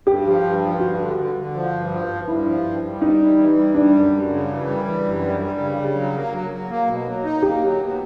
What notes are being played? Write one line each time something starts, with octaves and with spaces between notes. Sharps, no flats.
G2 G4
F3
G2
F3
G2 F#4
D3
D3
D3
F3
G2
F3
G2
G2 E4
F3
G2
G2
G3 D#4
E3
E3
G3
G3 D4
F#2
F#2
C#3
E3
G3
E3
F#2
G3
G3
C#3
C#3
F#3
A#3
F#3
F#3
A#3
B2
F#3
D#4
A#3 G4
F#3
B2